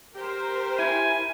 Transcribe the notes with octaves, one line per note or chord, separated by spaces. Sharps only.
G4 A#4 C5
E4 G#5